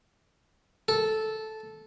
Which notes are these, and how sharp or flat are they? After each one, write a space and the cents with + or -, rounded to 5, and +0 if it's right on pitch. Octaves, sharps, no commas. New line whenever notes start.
A4 -10